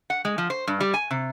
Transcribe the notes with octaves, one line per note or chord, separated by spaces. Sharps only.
F#5
G#3
F3
C5
G2
G3
G#5
C3